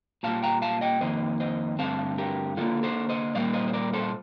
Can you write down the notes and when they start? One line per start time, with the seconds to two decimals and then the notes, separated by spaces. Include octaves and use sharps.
0.23 A#2 G3 A#3 F5 A5
0.43 G5 A#5
0.62 F5 A5
0.81 D#5 G5
1.01 F2 D#3 A#3 C5 D#5
1.40 C5 D#5
1.79 G2 D3 A3 C4 F5 A5
2.18 G4 A#4
2.57 D3 G3 F4 A4
2.61 A#3
2.83 A4 C5
3.09 C5 D#5
3.35 A#2 G3 A#3 D5 F5
3.54 C5 D#5
3.68 C5
3.73 A#4 D5
3.93 A4 C5